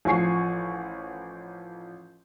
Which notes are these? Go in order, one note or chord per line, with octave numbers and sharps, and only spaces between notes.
A1 F3 G#5 C#6 C7